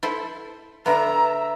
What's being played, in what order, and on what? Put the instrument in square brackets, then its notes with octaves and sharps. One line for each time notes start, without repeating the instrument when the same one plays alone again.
[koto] E4 A4 C5
[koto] D3 B3 [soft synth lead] E5 [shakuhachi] A#5